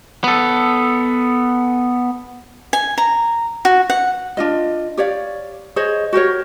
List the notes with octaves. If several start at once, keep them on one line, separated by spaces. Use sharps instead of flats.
B3 A4
G#5
A#5
F#4
F#5
D4 F4 D#5
G4 C#5 D5 F5
G#4 C5 C#5 D#5
F#4 G4 A#4 C#5